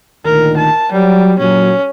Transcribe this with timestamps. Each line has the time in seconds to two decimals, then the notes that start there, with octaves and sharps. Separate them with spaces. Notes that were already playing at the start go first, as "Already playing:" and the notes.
0.25 D2 A#2 D#3 A#4
0.57 A5
0.92 F#3 G3
1.39 A#2 F#3 C#4